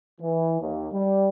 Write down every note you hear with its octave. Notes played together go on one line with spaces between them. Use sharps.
E3
D#2
G3